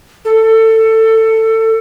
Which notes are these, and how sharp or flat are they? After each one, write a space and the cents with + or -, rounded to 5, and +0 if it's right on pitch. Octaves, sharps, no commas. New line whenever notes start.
A4 +20